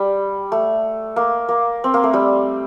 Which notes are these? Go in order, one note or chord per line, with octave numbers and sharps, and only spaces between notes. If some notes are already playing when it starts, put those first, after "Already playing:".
Already playing: G3
A3
A#3
A#3
C4
A#3
A3
G3